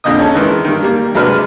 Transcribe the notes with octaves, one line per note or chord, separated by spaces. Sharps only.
A#1 F2 D3 A#3 D#5 D#6
C#4 A4
D#3 E3 G#3
G2 D#3
G3 A#3
C2 F#3 G#3 D4 B4 F6